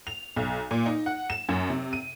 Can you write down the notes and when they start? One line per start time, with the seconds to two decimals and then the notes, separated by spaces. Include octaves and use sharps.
0.07 F7
0.36 B1
0.71 A#2
0.86 D#4
1.06 F#5
1.30 E7
1.49 F#2
1.70 C3
1.93 D#7